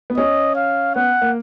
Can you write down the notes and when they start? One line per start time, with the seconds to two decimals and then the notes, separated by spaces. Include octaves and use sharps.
0.10 B3
0.17 C#4 D#5
0.56 F5
0.96 B3 F#5
1.22 A#3